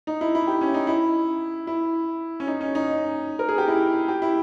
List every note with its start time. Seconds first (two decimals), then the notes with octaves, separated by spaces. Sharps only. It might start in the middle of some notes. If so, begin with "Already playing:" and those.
0.07 D#4
0.21 E4
0.35 E4
0.47 G4
0.61 C#4
0.74 D#4
0.87 E4
1.67 E4
2.40 C#4
2.47 D#4
2.61 C#4
2.75 D#4
3.39 A#4
3.49 G#4
3.58 G4
3.68 E4
4.08 G4
4.22 E4